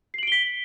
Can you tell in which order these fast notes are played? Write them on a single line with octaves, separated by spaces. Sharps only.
C7 F#7 D7 G7 B6